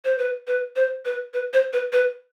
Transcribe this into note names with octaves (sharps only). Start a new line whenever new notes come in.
C5
B4
B4
C5
B4
B4
C5
B4
B4